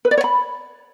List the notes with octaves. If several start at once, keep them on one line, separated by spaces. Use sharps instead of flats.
B4
D5
C#5
B5